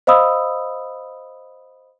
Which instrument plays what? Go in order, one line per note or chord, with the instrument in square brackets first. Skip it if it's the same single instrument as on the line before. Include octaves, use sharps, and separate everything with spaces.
[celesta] C5 D#5 F5 B5 D#6 E6